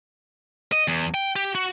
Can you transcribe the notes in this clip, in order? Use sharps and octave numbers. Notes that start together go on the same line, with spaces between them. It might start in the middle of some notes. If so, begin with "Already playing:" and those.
D#5
E2
G5
G4
F#4